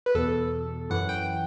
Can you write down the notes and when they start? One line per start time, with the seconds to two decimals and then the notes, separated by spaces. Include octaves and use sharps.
0.06 B4
0.15 E2 B2 A4
0.90 F#2 E3 F#5
1.09 G5